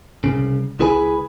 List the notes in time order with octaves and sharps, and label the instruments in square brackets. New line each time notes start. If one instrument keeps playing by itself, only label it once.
[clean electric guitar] C2 F#2 C#3
C#2 E4 G#4 B4 G#5 B5